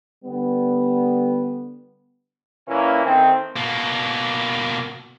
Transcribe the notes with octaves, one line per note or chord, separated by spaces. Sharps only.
D3 G3 B3
A#2 E3 A#3 C#4 E4
D#3 A3 C4
B2 A#3